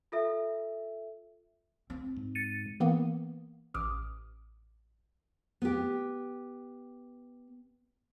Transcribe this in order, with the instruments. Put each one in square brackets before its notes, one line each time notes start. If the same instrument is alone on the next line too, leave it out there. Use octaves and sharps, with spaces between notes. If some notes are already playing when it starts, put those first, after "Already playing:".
[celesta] F4 A4 E5
[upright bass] C4
[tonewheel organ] G#2
[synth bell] A6 C#7 D#7
[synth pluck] E3 A#3 B3
A1 D6 D#6 F6
[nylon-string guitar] B3 G4